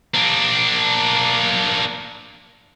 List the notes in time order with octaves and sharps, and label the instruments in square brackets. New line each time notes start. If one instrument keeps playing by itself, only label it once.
[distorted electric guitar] A#3 D4